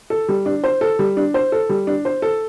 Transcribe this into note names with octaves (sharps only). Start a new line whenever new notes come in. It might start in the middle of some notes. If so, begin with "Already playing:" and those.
A4
G3
D4
C5
A4
G3
D4
C5
A4
G3
D4
C5
A4